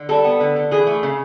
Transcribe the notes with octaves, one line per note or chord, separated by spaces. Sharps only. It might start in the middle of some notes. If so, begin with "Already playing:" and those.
Already playing: D3
G3 A4
B3
D3
D3
E3 G#4
A3
C#3